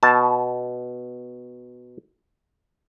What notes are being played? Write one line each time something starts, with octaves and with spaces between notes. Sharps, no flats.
B2 A5